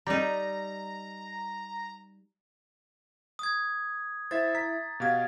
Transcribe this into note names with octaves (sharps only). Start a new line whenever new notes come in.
G3 D#4 A#5
D#6 G#6
E4 C5 E5 A6
A#5 B6
B2 G4 F5 G#6